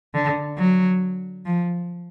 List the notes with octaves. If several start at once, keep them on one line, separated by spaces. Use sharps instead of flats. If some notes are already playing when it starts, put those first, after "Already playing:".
D3
F#3
F3